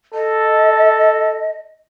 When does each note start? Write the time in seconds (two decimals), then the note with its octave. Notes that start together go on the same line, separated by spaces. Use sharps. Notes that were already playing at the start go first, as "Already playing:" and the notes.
0.14 A4 D#5